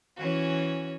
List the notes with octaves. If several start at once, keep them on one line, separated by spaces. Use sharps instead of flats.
E3 C#4 F#4